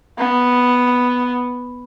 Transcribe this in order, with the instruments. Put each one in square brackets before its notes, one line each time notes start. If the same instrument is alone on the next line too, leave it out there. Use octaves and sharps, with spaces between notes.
[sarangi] B3